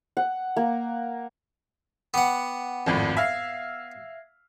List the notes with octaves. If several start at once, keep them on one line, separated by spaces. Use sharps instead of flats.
F#5
A#3
B3 F#5 G5 B5 D6
G#1 F2 A2 D5
E5 F5 G#6 A#6 C7